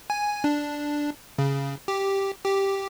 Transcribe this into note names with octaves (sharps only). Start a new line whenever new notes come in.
G#5
D4
C#3
G4
G4